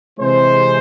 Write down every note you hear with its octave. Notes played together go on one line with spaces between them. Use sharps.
C3 E3 G#3 C5